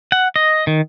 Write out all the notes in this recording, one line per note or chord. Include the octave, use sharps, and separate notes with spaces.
F#5
D#5
D#3